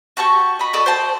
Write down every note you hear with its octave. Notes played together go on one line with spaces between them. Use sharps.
F#4 G4 A5 C#6
D#5 B5
F#4 A4 D5 D#5
C5 G5 A5